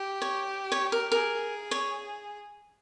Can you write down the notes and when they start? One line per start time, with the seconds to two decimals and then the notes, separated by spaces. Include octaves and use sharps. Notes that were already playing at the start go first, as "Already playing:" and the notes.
Already playing: G4
0.22 C#5
0.72 C#5
0.92 A#4
1.12 G#4 A#4
1.71 C#5